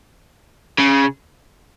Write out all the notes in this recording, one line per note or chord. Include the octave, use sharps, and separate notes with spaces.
C#3